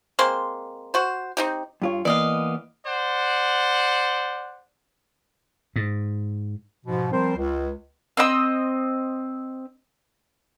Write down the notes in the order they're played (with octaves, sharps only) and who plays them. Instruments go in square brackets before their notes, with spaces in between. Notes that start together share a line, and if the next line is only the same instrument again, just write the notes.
[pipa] G#3 A#3 C4 C6
F#4 C5
C4 D#4 G4
[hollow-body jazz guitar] G2 F4 C#5
[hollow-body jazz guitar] E3 A#3 B3 [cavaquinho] D5 D#5 F5
[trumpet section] C5 D5 F#5
[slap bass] G#2
[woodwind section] G#2 B2 F3
F3 G3 C4 A#4 C5
C#2
[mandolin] C4 D#5 F#5 E6